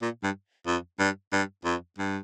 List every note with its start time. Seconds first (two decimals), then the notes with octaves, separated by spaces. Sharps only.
0.02 A#2
0.23 G2
0.67 F2
0.99 G2
1.33 G2
1.65 F2
1.98 G2